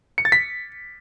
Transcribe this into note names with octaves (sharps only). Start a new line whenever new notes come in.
C#7
A6
B6